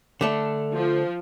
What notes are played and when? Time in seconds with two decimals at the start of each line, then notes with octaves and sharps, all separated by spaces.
0.21 D3 A3 D4
0.75 F3